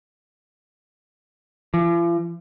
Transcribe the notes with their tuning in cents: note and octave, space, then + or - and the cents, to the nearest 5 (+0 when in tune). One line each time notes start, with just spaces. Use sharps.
F3 -45